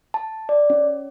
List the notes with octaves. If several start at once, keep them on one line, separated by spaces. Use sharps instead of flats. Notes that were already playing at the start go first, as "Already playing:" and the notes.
A5
D5
C#4